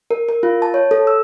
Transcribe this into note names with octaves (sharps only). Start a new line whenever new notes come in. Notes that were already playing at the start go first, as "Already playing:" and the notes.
A#4
A#4
F4
A5
C#5
A4
E6